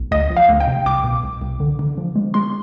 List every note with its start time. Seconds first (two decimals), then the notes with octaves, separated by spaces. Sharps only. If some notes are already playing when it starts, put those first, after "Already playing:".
Already playing: B1
0.11 D2 D#5
0.30 F3
0.37 F5
0.49 D2
0.60 G5
0.67 C3
0.86 C2 D6
1.04 B2
1.24 C2
1.42 C2
1.60 D3
1.79 D3
1.98 F3
2.16 G#3
2.34 G#3 C6